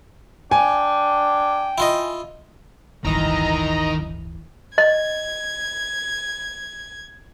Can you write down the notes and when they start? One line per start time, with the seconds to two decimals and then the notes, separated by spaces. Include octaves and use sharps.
0.51 D4 G5 G#5
1.78 E4 F4 D#5
3.04 D1 G1 D#3 E3 D#5 A#5
4.78 D#5 G#6